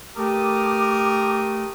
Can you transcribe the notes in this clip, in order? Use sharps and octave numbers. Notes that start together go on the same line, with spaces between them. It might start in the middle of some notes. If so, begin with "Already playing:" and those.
A3 G4 A#4 D6 D#6